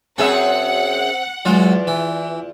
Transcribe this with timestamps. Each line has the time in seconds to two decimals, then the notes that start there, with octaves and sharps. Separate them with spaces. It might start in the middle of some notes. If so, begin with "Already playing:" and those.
0.18 F#2 C4 G#4 E5 F#5
1.45 E2 F#3 G#3 F4
1.87 E3